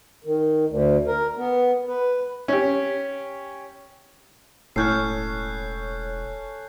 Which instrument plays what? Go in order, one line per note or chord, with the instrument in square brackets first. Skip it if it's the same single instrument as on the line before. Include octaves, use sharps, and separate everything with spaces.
[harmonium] D#3
D2
A#4
B3
B4
[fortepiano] C#4 G4
[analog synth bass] E1 [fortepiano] A2 [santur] C#4 A4 [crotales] F#6 G6 C7